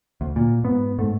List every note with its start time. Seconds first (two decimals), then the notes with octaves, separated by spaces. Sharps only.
0.21 D2
0.36 A#2
0.64 G#2 B3
0.98 G#2 A3